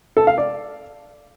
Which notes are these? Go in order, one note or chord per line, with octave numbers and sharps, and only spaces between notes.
A4
F5
D5